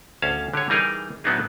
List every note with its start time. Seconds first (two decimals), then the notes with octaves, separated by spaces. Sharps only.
0.22 D2 C#4 F5 A5
0.54 D3 G4 G#4 C#5
0.69 E3 G3 D#4 G#4 A#4
1.24 A2 F#3 B3 D4 D#4 G#4